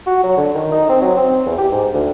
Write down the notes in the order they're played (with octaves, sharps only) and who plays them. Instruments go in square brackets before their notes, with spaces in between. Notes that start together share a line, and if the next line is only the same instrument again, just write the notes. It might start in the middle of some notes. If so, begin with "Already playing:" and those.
[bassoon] F#4
F#3
D3
D#3
D#4
C4
F#3
C4
E2
G4
G#2
D2